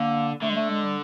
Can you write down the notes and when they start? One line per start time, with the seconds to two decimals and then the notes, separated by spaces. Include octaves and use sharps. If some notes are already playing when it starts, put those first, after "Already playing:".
Already playing: D3 A#3
0.41 D3 A3
0.50 G#3
0.56 A3
0.69 G#3
0.84 G3